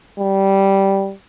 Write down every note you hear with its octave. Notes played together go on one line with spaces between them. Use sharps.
G3